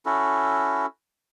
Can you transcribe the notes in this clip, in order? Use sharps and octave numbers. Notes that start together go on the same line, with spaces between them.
C#4 E4 F#4 A4